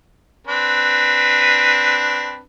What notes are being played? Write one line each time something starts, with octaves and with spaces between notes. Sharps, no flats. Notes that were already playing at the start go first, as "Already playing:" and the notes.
C4 D4 B4